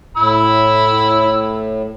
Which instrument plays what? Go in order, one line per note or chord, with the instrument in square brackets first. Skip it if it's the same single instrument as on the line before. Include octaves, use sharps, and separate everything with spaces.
[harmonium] A2 [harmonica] B5 E6